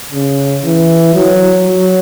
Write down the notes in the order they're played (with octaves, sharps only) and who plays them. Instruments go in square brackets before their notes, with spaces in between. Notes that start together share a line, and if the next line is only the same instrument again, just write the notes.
[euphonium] C#3
E3
F#3
F#3